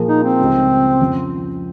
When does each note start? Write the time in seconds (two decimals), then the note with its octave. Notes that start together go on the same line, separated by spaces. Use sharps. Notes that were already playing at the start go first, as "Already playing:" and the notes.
Already playing: A#2 F3 A#3 F4 G#4
0.08 D#4
0.23 C4
0.39 C#2 C#3 G3
1.00 F2 C#3 F3